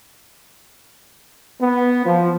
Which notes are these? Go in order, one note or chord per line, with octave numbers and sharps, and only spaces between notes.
B3
F3